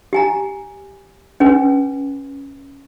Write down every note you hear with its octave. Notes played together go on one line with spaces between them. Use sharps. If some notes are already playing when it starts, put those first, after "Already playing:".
G4 G#5 A#5
C#4 G#4 B4 G#5